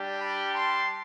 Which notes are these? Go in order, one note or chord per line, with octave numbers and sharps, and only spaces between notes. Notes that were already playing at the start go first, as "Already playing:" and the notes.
Already playing: G3 D4 G4
G5 B5
A5 C6